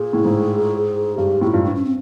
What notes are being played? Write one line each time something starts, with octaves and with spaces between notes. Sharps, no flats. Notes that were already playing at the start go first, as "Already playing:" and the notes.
Already playing: A#2 G#4
A2
G#2
G2 G4
A2 G4
F4
G2
D4
C#4
C4